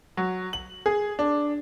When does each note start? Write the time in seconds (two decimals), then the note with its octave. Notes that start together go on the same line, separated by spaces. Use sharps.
0.17 F#3
0.53 F#7
0.86 G#4
1.19 D4